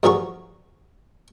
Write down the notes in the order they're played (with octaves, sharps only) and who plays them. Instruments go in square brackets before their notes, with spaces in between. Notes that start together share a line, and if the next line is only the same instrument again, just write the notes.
[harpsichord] G2 F3 F#3 G#4 A#4 C#6